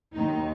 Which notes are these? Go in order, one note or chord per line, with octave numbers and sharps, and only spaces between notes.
D#2 D#3 F#3 D#4